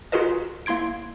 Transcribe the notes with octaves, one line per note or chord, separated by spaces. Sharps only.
F4 F#4 G#4 A#4 B4 D#5
A#3 E4 C6 G#6 D7